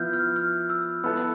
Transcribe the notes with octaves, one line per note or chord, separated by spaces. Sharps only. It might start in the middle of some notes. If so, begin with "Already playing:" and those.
Already playing: F3 B3 E4 F6 G6
F6
F6
E6
B3 E4 A4 E6